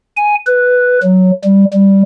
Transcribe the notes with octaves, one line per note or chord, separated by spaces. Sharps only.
G#5
B4
F#3
G3
G3